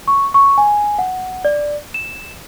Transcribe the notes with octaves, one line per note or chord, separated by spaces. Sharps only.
C#6
C#6
G#5
F#5
D5
E7